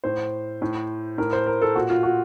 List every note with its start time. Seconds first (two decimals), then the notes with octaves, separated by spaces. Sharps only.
0.04 A2 C5
0.62 A2
1.18 A2 A#4
1.33 C5
1.47 A#4
1.62 A4
1.75 A#2 F#4
1.90 F4
2.03 F#4